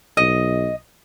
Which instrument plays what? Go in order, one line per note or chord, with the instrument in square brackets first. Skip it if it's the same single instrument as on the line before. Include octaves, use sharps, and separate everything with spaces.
[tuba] B1 [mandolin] D#5